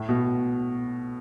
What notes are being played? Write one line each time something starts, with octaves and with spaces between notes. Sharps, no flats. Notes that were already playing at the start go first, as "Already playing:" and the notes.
Already playing: A2
B2